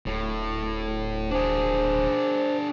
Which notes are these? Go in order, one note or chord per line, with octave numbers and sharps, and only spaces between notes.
D1 A2
D4 G#4 C5